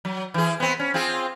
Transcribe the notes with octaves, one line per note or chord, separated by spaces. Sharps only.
F#3
E3 G#4
B3 C4
C#4
C4 F4 G#4